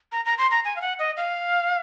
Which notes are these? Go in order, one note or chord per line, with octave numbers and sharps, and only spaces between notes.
A#5
A#5
C6
A#5
G#5
F5
F#5
D#5
F5